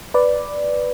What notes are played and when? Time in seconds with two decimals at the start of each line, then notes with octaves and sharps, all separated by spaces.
0.14 B4 D5